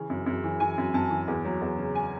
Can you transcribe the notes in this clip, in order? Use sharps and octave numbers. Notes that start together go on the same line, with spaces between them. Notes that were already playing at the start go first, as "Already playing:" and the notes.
Already playing: C#3 E3
F#2
F#2
E3
E3 G#5
F#2
F#2 A5
E3
E2
F#3
E2
C#3
G#5